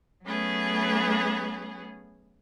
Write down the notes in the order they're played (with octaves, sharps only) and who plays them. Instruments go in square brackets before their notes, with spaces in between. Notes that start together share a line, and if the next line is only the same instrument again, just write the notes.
[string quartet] F#3 A3 B3 C#4 G#4